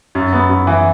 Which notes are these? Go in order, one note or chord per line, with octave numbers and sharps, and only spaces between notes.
F#2
B3
F#2
E3